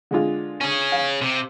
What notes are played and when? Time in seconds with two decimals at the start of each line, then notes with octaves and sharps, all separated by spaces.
0.11 D3 G#3 F4
0.61 C#4 G#4
0.92 F5
1.21 C3